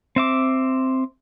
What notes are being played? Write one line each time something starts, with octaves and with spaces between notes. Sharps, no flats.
C4 E5 D6